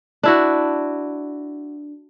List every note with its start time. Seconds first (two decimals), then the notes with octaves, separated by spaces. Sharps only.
0.23 D4 E4 F#4